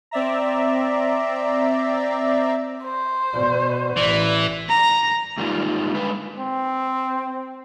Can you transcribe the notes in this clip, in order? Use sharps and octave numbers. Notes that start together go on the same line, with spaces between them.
C4 D5 E5 A#5
C5
B2 D5
A1 E3 D5
A#5
G#2 D#3 G3 A#3 F4
D3 G#3 B4
C4